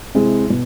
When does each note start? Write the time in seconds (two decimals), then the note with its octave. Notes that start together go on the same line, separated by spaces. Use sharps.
0.15 C3 G#3 C4 E4 G#4
0.50 B2